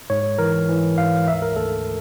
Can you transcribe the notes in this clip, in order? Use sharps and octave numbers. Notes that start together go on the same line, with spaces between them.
G#2 C#5
E3 A#4
E3
G#2 F5
D2 E5
A#4
D2 A4